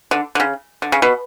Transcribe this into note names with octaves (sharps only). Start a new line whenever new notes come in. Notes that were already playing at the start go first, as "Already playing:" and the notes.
D3
D3
C#3
D3
C#3
B2